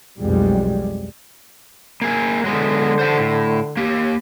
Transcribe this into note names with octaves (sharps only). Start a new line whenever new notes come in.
B1 F2 G3 G#3
A#3 G#4
D3 F#3 G#3 B3
C5 F#5 A5
A2
A#3 G4